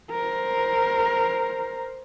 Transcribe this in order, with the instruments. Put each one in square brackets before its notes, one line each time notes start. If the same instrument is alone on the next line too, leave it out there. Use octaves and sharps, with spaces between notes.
[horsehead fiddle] A#4 C5